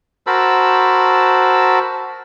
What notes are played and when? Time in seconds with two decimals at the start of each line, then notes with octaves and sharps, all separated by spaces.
0.27 F#4 A#4 C5 A5 B5 E6